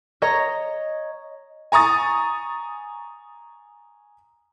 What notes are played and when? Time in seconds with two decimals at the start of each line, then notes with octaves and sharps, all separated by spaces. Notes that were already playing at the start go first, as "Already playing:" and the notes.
0.22 C#5 D#5 A#5 D#6
1.72 G#5 A#5 C#6 D#6 A6